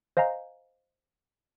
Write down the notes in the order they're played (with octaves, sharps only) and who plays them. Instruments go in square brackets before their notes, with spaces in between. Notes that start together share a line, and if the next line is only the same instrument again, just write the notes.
[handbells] C5 D#5 F5 G#5 A#5